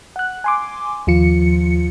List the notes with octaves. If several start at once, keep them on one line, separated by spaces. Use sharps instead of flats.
F#5 F#6
G#5 C6 D6
D#2 F3 F4 C#7